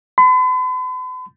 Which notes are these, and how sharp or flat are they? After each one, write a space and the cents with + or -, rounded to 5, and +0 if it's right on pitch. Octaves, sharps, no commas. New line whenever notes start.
B5 +45